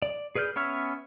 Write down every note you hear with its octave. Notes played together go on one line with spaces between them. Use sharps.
D5
G#4 B4 D5 F6 G6
B3 C#4 C#5 E5 F6